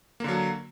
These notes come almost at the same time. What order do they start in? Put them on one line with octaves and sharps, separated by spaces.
A#3 D3 F#3